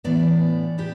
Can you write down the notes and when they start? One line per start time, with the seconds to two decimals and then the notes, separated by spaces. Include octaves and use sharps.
0.04 A2 E3 B3 D4 D5
0.78 B3 D4 G4